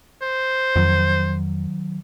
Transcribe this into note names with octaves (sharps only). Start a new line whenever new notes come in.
C5
F2 D#3 F#3